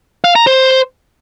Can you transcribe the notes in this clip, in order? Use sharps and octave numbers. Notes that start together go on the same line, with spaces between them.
F5
A#5
C5